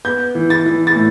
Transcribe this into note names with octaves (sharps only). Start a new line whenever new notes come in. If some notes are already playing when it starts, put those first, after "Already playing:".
B3 G6
E3
A6
E3
A6
A2